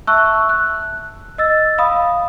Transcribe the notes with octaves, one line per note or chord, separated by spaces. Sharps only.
E5 A5 C#6 E6 F#6
F#6
D#5 E6 A6
F5 B5 D#6